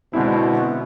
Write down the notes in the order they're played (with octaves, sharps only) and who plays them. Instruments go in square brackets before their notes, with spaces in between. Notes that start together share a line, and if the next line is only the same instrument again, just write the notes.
[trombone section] B2 [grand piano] D3 G#3 C4 E4